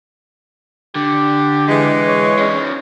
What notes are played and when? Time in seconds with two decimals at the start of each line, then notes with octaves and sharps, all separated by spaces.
0.95 D3 G4
1.68 E3 G#3
2.08 C#5
2.39 C#4 D#4